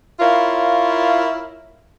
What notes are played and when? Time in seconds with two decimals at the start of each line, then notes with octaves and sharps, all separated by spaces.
0.19 E4 F4 A#4 C#5 F5